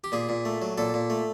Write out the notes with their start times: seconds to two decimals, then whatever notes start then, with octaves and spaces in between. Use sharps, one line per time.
0.04 G4
0.12 A#2 G#4
0.29 A#2
0.45 A3
0.62 F#3
0.78 A#2 A4
0.94 A#2
1.10 A3